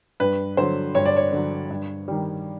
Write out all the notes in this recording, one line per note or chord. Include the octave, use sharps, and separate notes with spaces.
G2 B4
D3 F#3 C5
G2 C#5
D5
C#5
D3 F#3
G2
D#3 G3